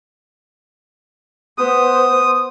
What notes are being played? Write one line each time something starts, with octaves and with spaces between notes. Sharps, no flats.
B3 C5 D#6